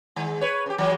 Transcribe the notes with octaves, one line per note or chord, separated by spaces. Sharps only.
D#3 G#3
B4 C#5
C#3 G4
E3 F#3 G#3